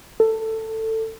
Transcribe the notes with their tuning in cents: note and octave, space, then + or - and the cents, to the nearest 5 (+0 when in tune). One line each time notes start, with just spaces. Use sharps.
A4 +15